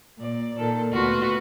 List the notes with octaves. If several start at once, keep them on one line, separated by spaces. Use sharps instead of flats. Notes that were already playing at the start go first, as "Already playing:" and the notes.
A#2 D5
A#2 D#3 A4
D2 B2 F4 F#4 B4